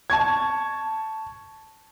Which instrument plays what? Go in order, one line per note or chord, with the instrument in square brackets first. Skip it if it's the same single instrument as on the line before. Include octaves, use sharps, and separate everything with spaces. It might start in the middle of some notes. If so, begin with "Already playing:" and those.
[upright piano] A5 C#6 G#6